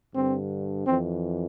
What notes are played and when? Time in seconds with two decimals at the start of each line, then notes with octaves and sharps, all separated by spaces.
0.15 G2 D3 C4
0.87 F2 E3 C4